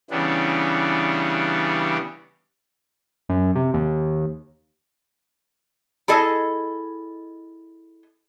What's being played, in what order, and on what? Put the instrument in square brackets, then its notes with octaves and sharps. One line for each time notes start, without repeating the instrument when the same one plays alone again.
[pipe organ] C#3 E3 G3 B3 D4
[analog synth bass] F#2
C3
D#2
[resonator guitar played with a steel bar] E4 G#4 A4 D#5